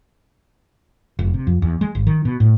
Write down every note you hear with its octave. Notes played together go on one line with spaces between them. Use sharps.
F1
C3
F2
E2
G#3
G#1
D#3
B2
A2